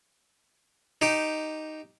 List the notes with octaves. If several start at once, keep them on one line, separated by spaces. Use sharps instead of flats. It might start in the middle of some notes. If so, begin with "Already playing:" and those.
D#4 G4